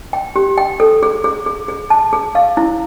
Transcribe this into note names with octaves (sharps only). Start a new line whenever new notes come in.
G5
G4
G5
A4
G#4
G#4
G#4
G#4
A5
G#4
F5
E4